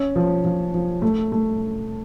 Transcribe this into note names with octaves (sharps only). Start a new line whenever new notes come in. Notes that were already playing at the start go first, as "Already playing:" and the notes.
Already playing: C#4
F3
F3
F3
A3
A3